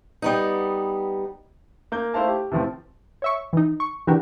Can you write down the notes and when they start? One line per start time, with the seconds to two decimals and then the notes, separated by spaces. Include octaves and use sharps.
0.22 G3 B3 D#4
1.92 A#3 G6
2.14 A3 E4 C5 F5 A5
2.28 G4
2.51 A2 C3 E3 F3 C4
3.22 C#5 E5 C#6
3.53 E3 D#4
3.80 C#6
4.07 D3 E3 D4 F#4 G4 A#4